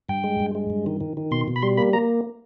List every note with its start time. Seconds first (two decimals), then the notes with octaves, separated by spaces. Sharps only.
0.09 G2 G5
0.24 G#3
0.40 G2
0.55 G#3
0.70 G2
0.86 D#3
1.01 D#3
1.17 D#3
1.31 B2 C6
1.48 B2
1.56 B5
1.62 G3 C6
1.77 A#3 B5
1.93 A#3 A#5